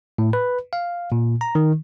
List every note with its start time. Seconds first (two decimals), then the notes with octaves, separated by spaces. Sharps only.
0.18 A2
0.33 B4
0.73 F5
1.12 A#2
1.41 A#5
1.55 D#3